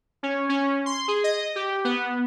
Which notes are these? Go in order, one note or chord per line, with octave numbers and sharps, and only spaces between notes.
C#4
C#4
C6
G#4
D#5
G4
B3